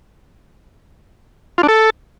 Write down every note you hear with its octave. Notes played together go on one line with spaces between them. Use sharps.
F4
D4
A4